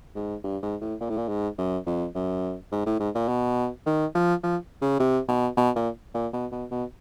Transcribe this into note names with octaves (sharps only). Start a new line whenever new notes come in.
G#2
G2
G#2
A2
A#2
A2
A#2
G#2
F#2
F2
F#2
G#2
A2
G#2
A#2
B2
D#3
F3
F3
C#3
C3
B2
B2
A#2
A#2
B2
B2
B2